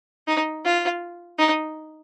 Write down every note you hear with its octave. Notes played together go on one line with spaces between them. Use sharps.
D#4
F4
D#4